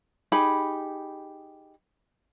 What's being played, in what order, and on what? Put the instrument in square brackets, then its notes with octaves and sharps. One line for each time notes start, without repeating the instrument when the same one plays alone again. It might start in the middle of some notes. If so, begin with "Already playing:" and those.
[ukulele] D#4 G4 G#4 B5